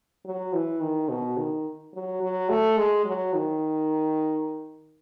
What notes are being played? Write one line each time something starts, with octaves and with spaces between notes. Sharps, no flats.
F#3
E3
D#3
B2
D#3
F#3
F#3
A3
G#3
F#3
D#3